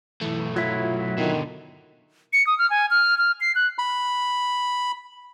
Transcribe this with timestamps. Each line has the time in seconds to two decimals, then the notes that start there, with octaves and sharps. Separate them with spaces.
0.21 B1 E3 A3
0.56 F#3 E4 F4
1.18 B2 D3 D#3
2.33 C#7
2.47 D#6
2.58 F6
2.70 G#5
2.90 F6
3.18 F6
3.41 C7
3.55 F#6
3.79 B5